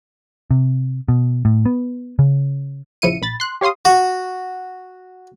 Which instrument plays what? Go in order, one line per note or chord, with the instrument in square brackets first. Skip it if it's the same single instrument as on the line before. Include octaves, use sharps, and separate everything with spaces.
[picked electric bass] C3
B2
A2
B3
C#3
[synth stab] A#1 C#3 F3 E4 C#7 D#7
A#1 B5 A6
C6 F#6
G4 C#5 F5 C6 D#6
[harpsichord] F#4